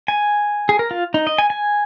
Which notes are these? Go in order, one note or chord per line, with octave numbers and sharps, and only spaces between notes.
G#5
G#4
A#4
F4
D#4
D#5
G#5
G#5